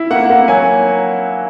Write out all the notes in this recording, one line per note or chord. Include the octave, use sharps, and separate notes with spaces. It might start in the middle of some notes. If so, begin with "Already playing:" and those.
Already playing: E4
A#3 F#5
A#3
F#3 G#5